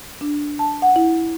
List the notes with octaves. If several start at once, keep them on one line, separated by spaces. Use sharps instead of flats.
D4
A5
F#5
E4